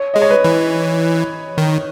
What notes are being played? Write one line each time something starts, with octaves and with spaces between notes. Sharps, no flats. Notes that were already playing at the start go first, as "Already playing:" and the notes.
Already playing: C#5
G#3 D#5
C#5
B4
E3
D#3